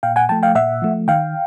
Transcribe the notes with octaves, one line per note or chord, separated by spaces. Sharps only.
A#2 F5 G5
F#5 G#5
F3 A3 G5 A5
F5 G5
A#2 E5 F#5
F3 A3
D#3 F5 G5